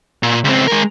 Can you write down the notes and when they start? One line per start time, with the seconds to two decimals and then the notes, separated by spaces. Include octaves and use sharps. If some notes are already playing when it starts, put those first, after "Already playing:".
0.23 A#2
0.44 C#2 C4
0.68 G#3 A#4